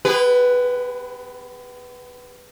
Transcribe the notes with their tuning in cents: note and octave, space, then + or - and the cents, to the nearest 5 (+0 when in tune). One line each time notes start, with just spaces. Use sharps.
B3 +45 G#4 -35 B4 +0